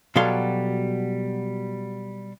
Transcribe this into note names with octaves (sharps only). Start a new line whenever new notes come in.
B2 F#3 G3 A4 F5 C6